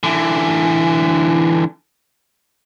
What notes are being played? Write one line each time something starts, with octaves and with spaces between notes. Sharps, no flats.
D3 E3